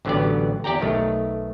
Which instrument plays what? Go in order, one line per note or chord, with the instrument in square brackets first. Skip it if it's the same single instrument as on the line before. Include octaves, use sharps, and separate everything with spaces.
[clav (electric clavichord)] A1 D3 F#3 B3 G4 D5
E2 G4 D5 G5 A#5
B1 D#3 A3 C#5